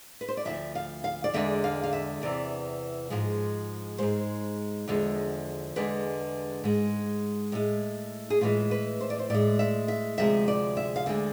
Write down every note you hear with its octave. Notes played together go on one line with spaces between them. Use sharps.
B4
C5
D5
D2 C3 F3 E5
F5
F5
D5
E2 D3 G#3 E5
F5
F5
E5
E2 C3 E3 D5
G#2 F3 G#3
G#2 G#3 C5
E2 D3 F3 G#3
E2 D3 G#3 B4
G#2 G#3
A2 G#3
G#4
A2 E3 G#3 F4
B4
C5
D5
C5
A2 G#3 D5
E5
E5
D2 C3 F3 G#3 E5
D5
E5
F5
D2 D3 F3 G#3 E5